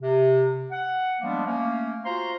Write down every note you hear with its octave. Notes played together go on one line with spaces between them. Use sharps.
C3
F#5
F3 G3 G#3 A#3 B3 D4
A3 A#3 C#4
F4 F#4 C5 F5 A#5 C6